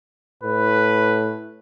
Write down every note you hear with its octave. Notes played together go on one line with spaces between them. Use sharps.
A2 B4